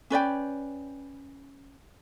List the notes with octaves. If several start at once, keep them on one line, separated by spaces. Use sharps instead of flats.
C#4 B4 D5 G5